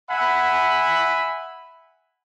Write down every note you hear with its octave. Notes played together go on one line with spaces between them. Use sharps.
E5 F#5 G#5 B5